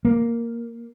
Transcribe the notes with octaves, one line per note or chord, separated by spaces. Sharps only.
A#3